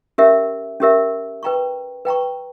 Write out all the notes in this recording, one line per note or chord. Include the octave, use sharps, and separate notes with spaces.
C#4 G4 A#4 E5
C#4 G4 A#4 E5
B4 G5 A#5 C#6
B4 G5 A#5 C#6